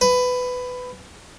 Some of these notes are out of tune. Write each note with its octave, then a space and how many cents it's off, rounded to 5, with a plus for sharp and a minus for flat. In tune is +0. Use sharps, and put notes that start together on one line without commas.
B4 +15